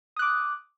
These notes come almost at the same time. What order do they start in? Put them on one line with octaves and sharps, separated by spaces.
D#6 F#6 D6